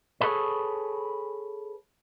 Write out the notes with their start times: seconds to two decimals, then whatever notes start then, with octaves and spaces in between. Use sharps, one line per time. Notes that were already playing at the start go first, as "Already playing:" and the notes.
0.21 G#4 A4 B4 C#5